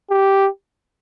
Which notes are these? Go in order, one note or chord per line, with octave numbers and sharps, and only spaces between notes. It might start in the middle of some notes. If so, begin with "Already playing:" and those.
G4